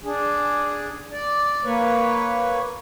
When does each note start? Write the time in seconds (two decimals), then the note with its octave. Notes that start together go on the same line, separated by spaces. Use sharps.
0.04 D4 G#4
1.11 D5
1.64 A#3 B4 C#5